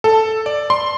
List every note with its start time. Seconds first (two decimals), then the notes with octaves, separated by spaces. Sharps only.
0.04 A4
0.46 D5
0.70 C6